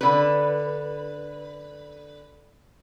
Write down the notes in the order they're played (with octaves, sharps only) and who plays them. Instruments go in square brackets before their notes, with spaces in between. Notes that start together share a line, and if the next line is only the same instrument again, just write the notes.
[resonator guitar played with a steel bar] D3 B4